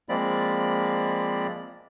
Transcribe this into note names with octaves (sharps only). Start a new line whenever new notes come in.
F3 G#3 A#3 C4 D5 B5